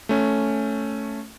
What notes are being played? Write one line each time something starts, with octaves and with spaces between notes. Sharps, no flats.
A3 C#4